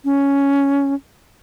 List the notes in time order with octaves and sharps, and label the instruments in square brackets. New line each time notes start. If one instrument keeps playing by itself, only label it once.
[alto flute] C#4